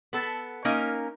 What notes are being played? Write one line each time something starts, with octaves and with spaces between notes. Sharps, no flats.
B3 A4
A#3 C#4 D#4 A#4